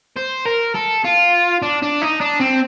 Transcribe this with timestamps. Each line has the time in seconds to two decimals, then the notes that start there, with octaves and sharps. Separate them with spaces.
0.17 C5
0.46 A#4
0.75 A4
1.05 F4
1.62 D4
1.82 D4
2.02 D#4
2.21 D4
2.40 C4